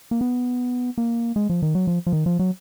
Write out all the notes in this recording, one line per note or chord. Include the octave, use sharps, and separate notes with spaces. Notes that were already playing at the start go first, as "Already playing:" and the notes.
A#3
B3
A#3
G#3
F3
D#3
F#3
F3
F3
D#3
F3
F#3